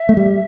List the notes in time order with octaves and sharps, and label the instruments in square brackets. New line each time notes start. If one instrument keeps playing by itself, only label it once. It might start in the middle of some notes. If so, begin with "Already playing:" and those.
Already playing: [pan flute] E5
[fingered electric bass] A3
G3